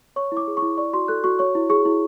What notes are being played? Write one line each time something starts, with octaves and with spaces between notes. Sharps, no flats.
C#5 C#6
E4 D6
G#4
C#6
E4
D5 C#6
F#4 C6
A4 F#6
F#4 C#6
C#5 C#6
E4
G#4 C#6
E4